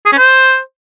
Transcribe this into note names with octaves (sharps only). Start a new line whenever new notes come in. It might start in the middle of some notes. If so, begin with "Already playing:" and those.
G#4
C#4
C5